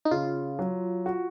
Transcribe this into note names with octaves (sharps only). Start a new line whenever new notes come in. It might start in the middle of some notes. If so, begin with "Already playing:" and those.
D#4
C#3 F4
F#3
F#4